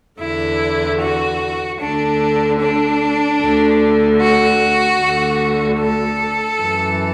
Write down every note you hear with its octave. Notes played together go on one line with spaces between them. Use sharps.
E2 D3 E4
F#4
D2 D3 D4
D4
D2 D3
F#4
D2 D3
A4
F#2 E3